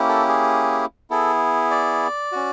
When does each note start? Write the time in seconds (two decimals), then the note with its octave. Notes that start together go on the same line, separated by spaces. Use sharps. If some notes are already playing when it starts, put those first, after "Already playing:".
Already playing: A#3 C#4 E4 G4
0.09 A4
0.28 G#4
1.10 B3 E4 G#4 A4
1.71 D5
2.32 C#4 F#4